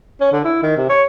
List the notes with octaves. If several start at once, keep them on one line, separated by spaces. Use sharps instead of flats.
C#4
D3
E4
D#3
C3
C#5